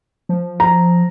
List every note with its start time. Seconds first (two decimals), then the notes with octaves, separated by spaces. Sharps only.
0.29 F3
0.60 A#5